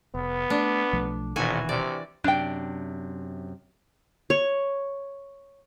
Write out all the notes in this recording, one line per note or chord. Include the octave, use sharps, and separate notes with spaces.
F1 B3
A3 D4
B1 F3 A3
D#1 A#1 B2 D#3 E3 F#4 G#5
C3 D5
F#2 C3 D4 G5
C#5